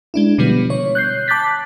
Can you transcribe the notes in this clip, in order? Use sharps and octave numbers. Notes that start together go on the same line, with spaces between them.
G#3 D4 E4
B2 D3 F3 G3 B3
C#5
F#6 G6 C7
A5 D6 F#6 G6 A6 B6